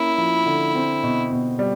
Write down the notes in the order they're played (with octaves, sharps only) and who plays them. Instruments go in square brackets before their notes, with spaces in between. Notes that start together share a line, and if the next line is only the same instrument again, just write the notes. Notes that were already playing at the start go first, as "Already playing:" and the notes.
Already playing: [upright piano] A#3 C#4 [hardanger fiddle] E4
[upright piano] F3
D3
C4
B2
B2
G3